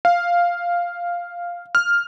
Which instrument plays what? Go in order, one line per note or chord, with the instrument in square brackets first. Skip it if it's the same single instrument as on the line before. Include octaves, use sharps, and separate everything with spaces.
[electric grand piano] F5
F6